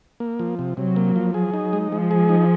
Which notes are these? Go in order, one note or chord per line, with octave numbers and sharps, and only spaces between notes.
A#3
F3
C3
C3 F#3
A#3
F3
F#3 G#4
D#4
G#3
F3 G#3
G#4
D#4